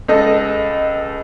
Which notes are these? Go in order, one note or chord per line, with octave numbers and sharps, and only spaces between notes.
C#2 A4 D#5